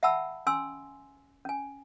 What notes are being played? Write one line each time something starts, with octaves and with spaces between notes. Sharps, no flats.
E5 F#5 G5 A5 B5 E6
C#4 G#5 C6 E6
C#4 G#5